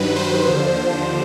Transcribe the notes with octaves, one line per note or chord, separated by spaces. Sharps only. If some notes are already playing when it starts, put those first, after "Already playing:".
Already playing: G2 D#3 F#3 B4
C5
D#2 D3 F3